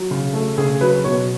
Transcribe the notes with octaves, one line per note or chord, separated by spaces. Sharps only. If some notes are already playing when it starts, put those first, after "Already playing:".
Already playing: F#3
C#3
A3
C#3 G#4
F#3 B4
B2 C#5